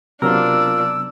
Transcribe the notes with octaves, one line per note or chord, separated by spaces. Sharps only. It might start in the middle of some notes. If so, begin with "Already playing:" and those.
C3 F#3 B3 D4 F4 A#4 E6